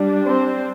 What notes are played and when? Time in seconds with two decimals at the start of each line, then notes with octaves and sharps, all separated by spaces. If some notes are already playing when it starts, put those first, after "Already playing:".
Already playing: G3 D4
0.25 C4 C5